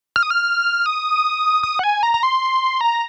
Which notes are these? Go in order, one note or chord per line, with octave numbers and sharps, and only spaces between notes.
F6
D#6
F6
D#6
D#6
F#5
G#5
A#5
A#5
C6
A#5